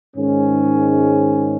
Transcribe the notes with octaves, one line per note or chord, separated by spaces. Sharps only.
G#2 D#3 G#3 C#4